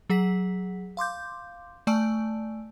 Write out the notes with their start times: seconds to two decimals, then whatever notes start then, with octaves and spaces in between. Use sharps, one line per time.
0.10 F#3 G#4 F#5 B6
0.97 F5 C6 D6 G6
1.87 A3 D5 G#5 A5 E6 D7